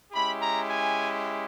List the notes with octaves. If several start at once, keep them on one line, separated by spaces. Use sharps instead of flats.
G#3 C#4 E4 G4 B5
A#5
G#5